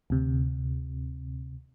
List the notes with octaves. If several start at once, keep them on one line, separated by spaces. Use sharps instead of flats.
D2 C3